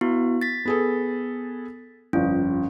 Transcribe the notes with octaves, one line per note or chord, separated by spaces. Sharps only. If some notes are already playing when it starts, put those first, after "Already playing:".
B3 E4 F#4
A6 B6
B3 G#4 A4
G1 F2 C#4